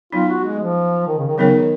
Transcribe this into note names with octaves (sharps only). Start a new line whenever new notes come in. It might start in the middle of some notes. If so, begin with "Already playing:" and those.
F#3 B3 D#4 F4
F#4
G#3
F3
D#3
C#3
D#3
C#3 F#3 B3 D#4 A#4 C#5
D#3